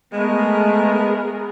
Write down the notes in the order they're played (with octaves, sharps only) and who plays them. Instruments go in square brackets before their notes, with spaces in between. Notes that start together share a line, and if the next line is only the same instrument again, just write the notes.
[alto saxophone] G#3 [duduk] A3 [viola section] B3 G#4 A#4